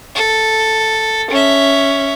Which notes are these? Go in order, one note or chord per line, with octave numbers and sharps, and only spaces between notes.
A4
C#4 E5